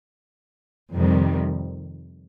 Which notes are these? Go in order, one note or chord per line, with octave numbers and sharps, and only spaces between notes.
F2 C3 D#3 G3